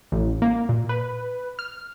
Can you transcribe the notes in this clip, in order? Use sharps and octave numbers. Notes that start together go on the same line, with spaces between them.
A1
A#3
A#2
B4
F6